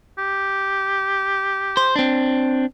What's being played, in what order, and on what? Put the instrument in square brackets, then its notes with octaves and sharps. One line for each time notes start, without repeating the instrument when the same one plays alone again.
[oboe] G4
[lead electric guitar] C5
C4 D4